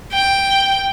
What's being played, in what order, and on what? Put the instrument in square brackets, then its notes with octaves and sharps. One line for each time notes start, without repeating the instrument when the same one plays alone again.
[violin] G5